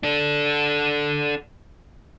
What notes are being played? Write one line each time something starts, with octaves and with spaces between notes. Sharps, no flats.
D4 A4